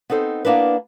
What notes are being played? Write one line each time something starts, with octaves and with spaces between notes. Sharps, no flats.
B3 C4 D#4 A4 C5
A#3 B3 D4 E4 A#4 B4